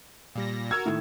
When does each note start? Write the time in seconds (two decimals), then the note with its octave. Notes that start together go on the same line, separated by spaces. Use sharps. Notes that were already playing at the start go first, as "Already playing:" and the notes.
0.36 A#2 G3 A#6
0.71 F#4 A#4 E6 G#6
0.86 A2 D#3